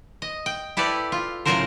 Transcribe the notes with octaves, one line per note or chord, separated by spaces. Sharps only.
D#5
G5
E4 G4 A4 B4 D5
F4
A2 C#3 F#3 F4 A#4 C5